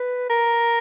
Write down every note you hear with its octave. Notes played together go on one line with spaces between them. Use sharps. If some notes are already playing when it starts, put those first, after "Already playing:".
Already playing: B4
A#4